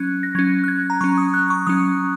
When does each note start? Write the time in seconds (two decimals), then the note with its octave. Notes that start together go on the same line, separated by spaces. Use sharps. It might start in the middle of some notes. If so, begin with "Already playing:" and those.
Already playing: F#3 C#4 F#6 G#6
0.23 A#6
0.35 F#3 C#4 G#6
0.64 F#6
0.68 G#6
0.90 A#5
1.01 F#3 C#4 C#6
1.18 D#6
1.34 F#6
1.50 C#6
1.67 F#3 C#4 D#6